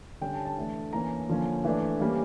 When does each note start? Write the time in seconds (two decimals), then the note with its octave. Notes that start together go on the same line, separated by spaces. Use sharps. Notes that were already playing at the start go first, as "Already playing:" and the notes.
0.21 D3 G3 C#4 G5
0.33 A5
0.45 A5
0.57 E3 A3 D4
0.93 E3 A#3 C#4 A#5
1.29 D3 F3 A#3 C#4
1.65 E3 A3 D4
2.01 E3 G3 A#3 C#4